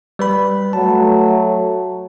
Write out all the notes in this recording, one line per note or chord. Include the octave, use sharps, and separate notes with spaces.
G3 B4 B5
F#3 A3 A5